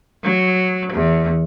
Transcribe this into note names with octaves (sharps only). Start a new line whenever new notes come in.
F#3
E2